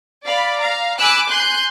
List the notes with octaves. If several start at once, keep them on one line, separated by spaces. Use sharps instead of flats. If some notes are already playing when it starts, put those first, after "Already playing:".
D5 F5 B5
F5 A#5
G#5 B5 D6 E6 F#6
G#5 C6 F#6 G6